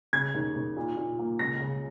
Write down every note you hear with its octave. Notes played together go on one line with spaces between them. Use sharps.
C#3 G#6
D#2
D#2
A#2
A#2
A#3
C#2 A#6
C#3